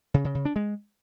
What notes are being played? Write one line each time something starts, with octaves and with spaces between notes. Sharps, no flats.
C#3
C#3
C#3
D4
G#3